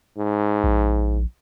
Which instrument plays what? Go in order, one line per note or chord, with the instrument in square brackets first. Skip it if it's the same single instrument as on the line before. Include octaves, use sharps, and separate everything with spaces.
[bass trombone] G#2
[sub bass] A#1